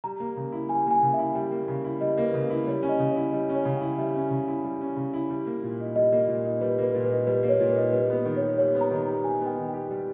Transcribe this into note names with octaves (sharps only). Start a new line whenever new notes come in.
G3 A#5
A#3
C#3
E4
G3 G#5
A#3 G#5
C#3
E5
E4
G3 G5
A#3
C#3
E4
G3 D#5
A#3
B4
C#3
E4 B4
G3 C#5
C#4
D#5
C#3
E4 C#5
G3 D#5
C#4
C#5
C#3
E4 G5
G3 E5
C#4
C#3
E4
G3
C#4
C#3
E4
G3
A#3
A#2
D#4
G3 D#5
A#3
A#2
D#4
G3 B4
A#3 B4
A#2
B4
D#4
G3 B4
A#3
C#5
A#2
D#4 B4
G3 B4
B3 B4
D#3
C#5
G4
G3 C#5
B3
A#5
D#3
A#5
G4
G3 G#5
B3
G5
D#3
G4 G5
G3